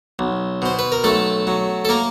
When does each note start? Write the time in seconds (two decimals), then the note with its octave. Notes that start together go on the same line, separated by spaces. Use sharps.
0.19 B1
0.62 B2 C5
0.79 B4
0.92 A#4
1.04 B1 A3 A4
1.47 F#3
1.85 A4
1.89 A#3 A#4